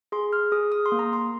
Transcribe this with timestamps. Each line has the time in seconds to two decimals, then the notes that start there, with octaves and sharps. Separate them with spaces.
0.12 G#4 C6
0.33 F6
0.52 G#4 D#6
0.72 D#6
0.86 C6
0.92 A#3
0.99 A#5
1.13 C6